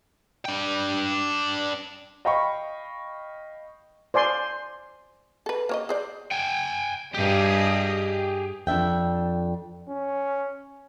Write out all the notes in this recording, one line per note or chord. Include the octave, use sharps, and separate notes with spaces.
D4 G5
D#5 F5 G5 B5 C#6
C5 D5 G#5 C6
A4 B4
A#3 C#5 D#5
G#4 C5 D5
G5 G#5
G2 G4 G#4 D#5
F2 D4 E5 G5
C#4